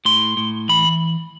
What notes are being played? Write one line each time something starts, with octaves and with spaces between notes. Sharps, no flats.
A2 C6
A2
E3 B5